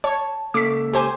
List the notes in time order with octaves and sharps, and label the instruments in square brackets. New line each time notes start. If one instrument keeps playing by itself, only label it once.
[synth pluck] C#5 [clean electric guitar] A5
[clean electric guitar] C#2 A#3 A4 [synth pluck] D6 B6
[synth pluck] G4 C5 G#5